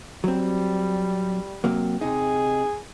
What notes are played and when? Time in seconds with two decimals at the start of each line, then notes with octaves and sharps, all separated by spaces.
0.24 F#3 G3 C4
1.64 C3 F#3 A#3
2.01 C3 D#4 G#4